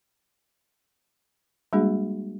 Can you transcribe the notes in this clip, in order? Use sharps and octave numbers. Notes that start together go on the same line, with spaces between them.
G3 G#3 A#3 D4 F#4 G#4